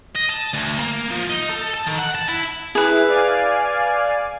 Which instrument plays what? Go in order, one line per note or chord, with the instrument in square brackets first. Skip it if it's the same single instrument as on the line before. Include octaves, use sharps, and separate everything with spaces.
[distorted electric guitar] D#5
A5
D2
A#3
F3
D#4
A4
A5
D#3
F#5
A5
E4
[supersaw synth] E4 [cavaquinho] G#4 B4
[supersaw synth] D5 F5 G#5